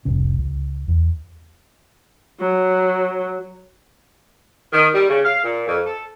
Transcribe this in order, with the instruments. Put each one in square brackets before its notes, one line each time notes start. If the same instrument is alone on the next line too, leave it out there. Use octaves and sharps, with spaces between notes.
[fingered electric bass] F1 C2 C#4
C#2
E2
[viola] F#3
[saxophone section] D#3
G3
C#3
F5
A#2
F2
A4